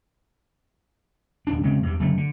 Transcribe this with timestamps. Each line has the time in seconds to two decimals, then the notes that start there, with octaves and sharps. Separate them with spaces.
1.47 D#1 D4
1.64 C#3 G#3 A3 C4
1.83 E2 G2
1.99 F#1 F#2 D3 A3
2.17 D3